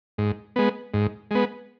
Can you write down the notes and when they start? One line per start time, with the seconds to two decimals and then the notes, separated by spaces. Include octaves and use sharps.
0.18 G#2
0.56 G#3 B3
0.94 G#2
1.31 G#3 B3